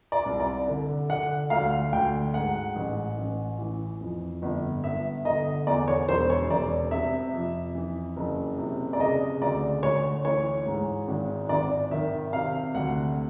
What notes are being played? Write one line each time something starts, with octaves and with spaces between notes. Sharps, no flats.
D5
C2
D5
D3
D3 F#5
D2 F5
D2 G5
G#2 F#5
A1
A1
E3
F2
G1
G1 E5
D3 D#5
E2 D5
C#5
E1 C5
C#5
E1 D5
C3 E5
F2
E3
F#1
C3
D5
C#3 D#5
D2 D5
D2 C#5
E3 C#5
G#2
G#1
G#1 D5
D#3 E5
C3 F5
D2 F#5